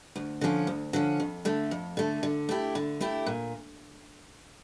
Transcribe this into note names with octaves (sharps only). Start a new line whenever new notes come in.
D2
D3 F3 C#4
D2
D3 F3 C#4
F2
D3 A3
F2
D3 A3
D3
A3 E4 G4
D3
A3 E4 G4
A#2